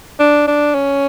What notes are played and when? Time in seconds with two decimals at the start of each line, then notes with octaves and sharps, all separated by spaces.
0.20 D4
0.47 D4
0.74 C#4